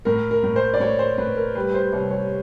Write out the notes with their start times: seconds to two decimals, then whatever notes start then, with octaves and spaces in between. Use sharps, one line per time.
0.05 A2 A#4
0.31 A#4
0.44 A2
0.56 C5
0.74 D5
0.80 A2 C#5
0.99 C5
1.18 A2 B4
1.36 A#4
1.55 G3 B4
1.74 C5
1.93 C2 C#5
2.11 C#5